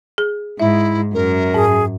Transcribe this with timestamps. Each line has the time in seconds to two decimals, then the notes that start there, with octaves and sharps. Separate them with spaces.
0.18 G#4
0.60 G#2 E4 E5
1.14 F#2 A#4
1.54 G#2 G#4